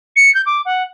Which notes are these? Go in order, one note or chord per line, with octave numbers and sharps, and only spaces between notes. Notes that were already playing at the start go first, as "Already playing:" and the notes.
C#7
G6
D6
F#5